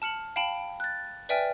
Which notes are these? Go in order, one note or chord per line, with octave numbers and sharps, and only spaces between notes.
A5 F6 C#7 F#7
F5 G5 A5 B5 D7
F#6 A6
B4 D5 E5 G5 G#5 F6